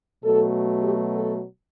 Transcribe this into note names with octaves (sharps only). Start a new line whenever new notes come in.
B2 F#3 A3 A4
G4
A4